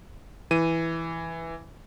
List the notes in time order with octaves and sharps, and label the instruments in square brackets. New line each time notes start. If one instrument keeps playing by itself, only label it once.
[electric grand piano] E3 D#7